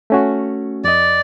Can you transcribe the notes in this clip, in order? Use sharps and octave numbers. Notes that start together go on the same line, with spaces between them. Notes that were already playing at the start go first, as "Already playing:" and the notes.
A3 C#4 F#4
F2 D5 D#5